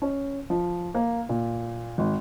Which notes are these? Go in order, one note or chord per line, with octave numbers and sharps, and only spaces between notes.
C#4
F3
A#3
A#2
G#1